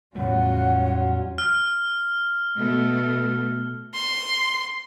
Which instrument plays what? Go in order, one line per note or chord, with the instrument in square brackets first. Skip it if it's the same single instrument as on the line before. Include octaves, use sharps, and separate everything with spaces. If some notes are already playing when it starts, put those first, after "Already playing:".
[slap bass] E2 A2 A3 [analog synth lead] F#3 [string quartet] G3 C#4 F4 [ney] F#5
[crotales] F6
[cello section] B2 A3
[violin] C6